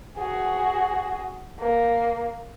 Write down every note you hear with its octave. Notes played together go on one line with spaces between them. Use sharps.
F#4 G#4
A#3